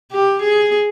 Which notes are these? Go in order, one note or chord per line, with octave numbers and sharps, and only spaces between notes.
G4
G#4